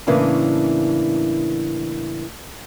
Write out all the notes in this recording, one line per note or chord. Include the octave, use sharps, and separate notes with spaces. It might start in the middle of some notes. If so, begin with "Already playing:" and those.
A2 C#3 E3 A#3 C#4 D4